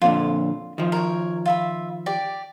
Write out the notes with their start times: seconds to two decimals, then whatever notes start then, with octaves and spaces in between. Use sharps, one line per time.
0.02 F2 A#2 D3 F4
0.78 D#3 F3
0.92 A#4 C#5
1.46 F4 E5 B5
2.06 G4 D5